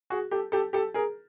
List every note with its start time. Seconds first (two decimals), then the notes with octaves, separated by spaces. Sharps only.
0.10 F#4 G#4
0.31 G4 A4
0.52 G4 A4
0.73 G4 A4
0.94 G#4 A#4